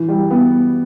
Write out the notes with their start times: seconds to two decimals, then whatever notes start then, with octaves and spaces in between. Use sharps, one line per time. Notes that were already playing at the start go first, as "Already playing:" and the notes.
Already playing: E3
0.08 G3
0.31 B3